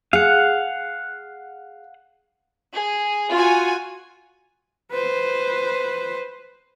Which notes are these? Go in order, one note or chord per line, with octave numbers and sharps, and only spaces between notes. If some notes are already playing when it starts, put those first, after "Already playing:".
G#4 F5 F#5
G#4
F4 F#4 G#5
B4 C5